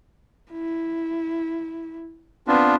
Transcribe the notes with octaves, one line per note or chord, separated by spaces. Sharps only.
E4
B3 C4 D4 F4 B4